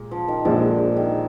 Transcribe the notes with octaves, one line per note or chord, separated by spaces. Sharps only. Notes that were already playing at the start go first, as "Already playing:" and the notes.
Already playing: A#2 G#3
F3
D#3
A#1 A#2 D3 F3 G#3
D#3